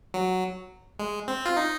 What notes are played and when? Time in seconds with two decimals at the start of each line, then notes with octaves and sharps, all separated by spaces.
0.14 F#3
0.99 G#3
1.28 C4
1.46 F4
1.57 D#4